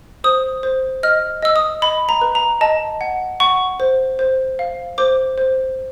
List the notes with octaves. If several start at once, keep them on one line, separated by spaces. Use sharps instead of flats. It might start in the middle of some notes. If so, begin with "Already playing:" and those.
C5 D#6
C5
D#5 F6
D#5 E6
D#6
D#5 B5
A#5
B4
A#5
D#5 A5
F#5
F#5 C#6
C5
C5
F5
C5 D6
C5